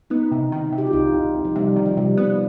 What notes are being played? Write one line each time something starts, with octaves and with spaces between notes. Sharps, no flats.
B3 D#4
C3
D#3
C3
G4
F4
C2 D#4
C2
C2
F3
C3 G3
D#3
F3
C3 G3
B3